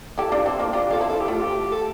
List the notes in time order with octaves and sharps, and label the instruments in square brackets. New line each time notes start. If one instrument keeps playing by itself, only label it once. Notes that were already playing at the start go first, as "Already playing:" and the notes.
[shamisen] E4 G4 [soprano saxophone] A4
[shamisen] D4 F4
C4 E4
A#3 D4
[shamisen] D4 F4 [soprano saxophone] G4
[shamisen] F4 [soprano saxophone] A4
[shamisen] C4 E4
[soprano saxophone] A4
G4
[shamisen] A3 [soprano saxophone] F4
[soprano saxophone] G4
A4